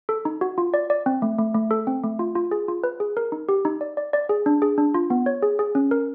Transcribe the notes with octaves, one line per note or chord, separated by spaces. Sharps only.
A4
D#4
F#4
F4
D5
D5
C4
A3
A3
A3
A4
C4
A3
F4
F4
G#4
F4
B4
G#4
A#4
D#4
G4
D#4
D5
D5
D5
G#4
D4
G#4
D4
F4
B3
C#5
G#4
G#4
C#4
A#4